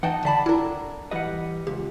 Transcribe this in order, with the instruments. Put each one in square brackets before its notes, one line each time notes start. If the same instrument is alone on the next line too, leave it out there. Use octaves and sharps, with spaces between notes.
[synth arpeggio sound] E3 [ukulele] D#4 D#5 A5 [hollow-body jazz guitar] F#5 G5
[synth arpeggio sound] D3 B6 [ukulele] D5 A5 B5
[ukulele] D4 A#4 [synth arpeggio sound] E4 A4
[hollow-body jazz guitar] E3 G3 D#5 [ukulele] B4 F#5
[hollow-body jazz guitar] C#2 [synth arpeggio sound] G4